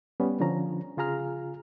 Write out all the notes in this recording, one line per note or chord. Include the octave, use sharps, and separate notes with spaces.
G3 B3 C#4
D3 F3 C#4 A#5
C#3 F4 G#4 A#5 F6